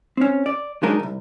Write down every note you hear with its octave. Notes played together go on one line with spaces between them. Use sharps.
C4 C#4
D5
F#3 G#3 D4 D#4 A#4 D#5
C2 F2